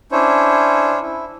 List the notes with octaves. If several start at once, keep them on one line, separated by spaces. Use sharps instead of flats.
C#4 D4 E4 C5 C#5
E4